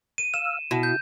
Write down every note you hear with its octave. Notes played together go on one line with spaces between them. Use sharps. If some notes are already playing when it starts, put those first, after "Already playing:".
D#7
F5 E6 E7
B2 E4 F#4
G6